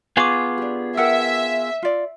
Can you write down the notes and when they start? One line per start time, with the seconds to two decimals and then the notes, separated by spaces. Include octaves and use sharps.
0.17 B3 F4 G#4 G#5 C#6 D6
0.58 D4 G4
0.97 A#4 E5 F#5 G5 E6
1.82 F4 D5